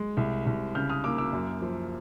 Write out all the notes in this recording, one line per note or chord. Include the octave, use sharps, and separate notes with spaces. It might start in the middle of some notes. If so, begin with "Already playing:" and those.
Already playing: G#3
C2
C2
C#3 F6 G6
D#6 F6
A#3 D6 E6
D6 E6
F#2
F3